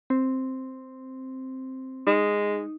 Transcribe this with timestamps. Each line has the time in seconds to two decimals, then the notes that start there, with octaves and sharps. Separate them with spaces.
0.10 C4
2.07 G#3 D#4